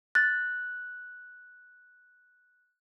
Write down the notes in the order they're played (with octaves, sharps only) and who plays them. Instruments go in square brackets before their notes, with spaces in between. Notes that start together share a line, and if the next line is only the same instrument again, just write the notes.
[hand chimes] F#6 [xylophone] A6